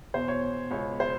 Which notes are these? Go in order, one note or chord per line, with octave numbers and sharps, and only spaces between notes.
E2 B2 C5
C#5
C#2 B2 C#5
C5